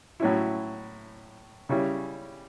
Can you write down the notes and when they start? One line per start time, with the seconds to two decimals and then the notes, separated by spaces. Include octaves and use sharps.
0.20 A2 F#3 C#4 E4
1.69 C#3 G3 C#4 E4